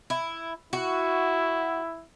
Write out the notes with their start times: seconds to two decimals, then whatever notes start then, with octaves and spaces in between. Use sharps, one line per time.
0.10 E4
0.73 E4 F#4